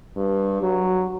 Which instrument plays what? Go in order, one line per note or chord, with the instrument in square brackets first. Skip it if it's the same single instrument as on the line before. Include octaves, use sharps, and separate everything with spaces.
[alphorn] G2
F#3